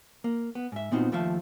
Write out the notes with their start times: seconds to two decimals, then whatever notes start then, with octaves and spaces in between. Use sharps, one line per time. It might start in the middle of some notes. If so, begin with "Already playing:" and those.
0.24 A#3
0.55 B3
0.72 G#2 E5
0.91 A#2 B3 C4 D#4 F4 F#4
1.12 D#2 F3 A3 F4 E5 F5